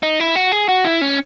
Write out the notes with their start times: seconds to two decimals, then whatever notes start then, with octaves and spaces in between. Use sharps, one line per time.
0.03 D#4
0.20 E4
0.35 F#4
0.52 G#4
0.69 F#4
0.85 E4
1.01 C#4